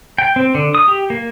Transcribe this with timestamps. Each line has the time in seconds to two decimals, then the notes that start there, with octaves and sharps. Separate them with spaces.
0.18 G5
0.36 C4
0.55 D3
0.75 D#6
0.88 G4
1.10 A#3